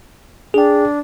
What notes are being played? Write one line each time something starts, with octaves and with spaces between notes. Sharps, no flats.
D4 G#4 G5